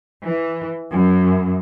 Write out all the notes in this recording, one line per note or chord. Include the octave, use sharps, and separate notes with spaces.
E3
F#2